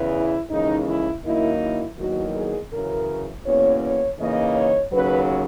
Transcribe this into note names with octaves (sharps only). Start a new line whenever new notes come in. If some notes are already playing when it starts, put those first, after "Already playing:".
Already playing: E2 C#3 E3
E4
D#2 C#3 E3 G#3 D#4
E4
F#2 D#3 A#3 D#4 E4
E4
E2 D#3 F#3 A#3 D#4 F#4
G#4
F#2 C#3 E3 A#4
E2 B2 A#3 C#4 C#5
C#5
C#3 E3 A#3 D#4 D#5
C#5
D#2 C#3 F#3 B4